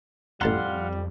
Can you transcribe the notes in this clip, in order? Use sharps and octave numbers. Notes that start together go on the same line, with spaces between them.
A1 F2 G3 F5 F#5 A5 A#5 C6